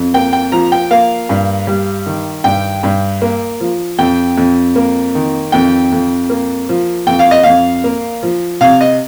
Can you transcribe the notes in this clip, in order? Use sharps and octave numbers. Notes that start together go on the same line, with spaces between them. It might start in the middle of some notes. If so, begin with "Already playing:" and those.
Already playing: F2
A#3 G5
G5
F3 A#5
G5
A#3 F5
G2
G3
D#3
G2 G5
G2
A#3
F3
F2 G5
F2
A#3
D#3
F2 G5
F2
A#3
F3
F2 G5
F5
D#5
F2 F5
A#3
F3
C3 F5
D#5